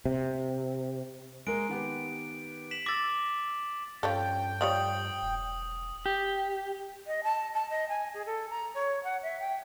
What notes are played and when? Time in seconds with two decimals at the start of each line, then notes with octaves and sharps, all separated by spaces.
0.06 C3
1.47 G#3 A#3 A#4 D7
1.69 D#3 B3 G4
2.71 B6 E7 F#7
2.86 D6 E6 A6 A#6
4.03 G2 F3 C#4 A4 G5
4.61 F3 G3 C#5 D#6 F#7
5.22 E1
6.06 G4
7.07 D#5
7.24 A5
7.54 A5
7.70 D#5
7.89 G#5
8.14 G#4
8.26 A4
8.50 A#5
8.75 C#5
9.04 F#5
9.23 E5
9.40 G5